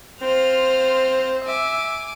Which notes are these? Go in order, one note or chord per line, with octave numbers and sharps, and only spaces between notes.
C4 F4 C5 F6
E5 G#5 D6